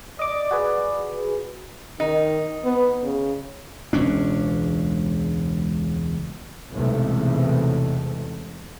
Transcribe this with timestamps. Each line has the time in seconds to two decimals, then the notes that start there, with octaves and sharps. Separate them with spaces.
0.19 D5 D#5 D6
0.51 F#4 G#4 B4
2.00 D#3 D#4
2.64 B3
3.03 C#3
3.93 E1 C#2 C#4 D4
6.73 B1 E2 G#2 C3 A3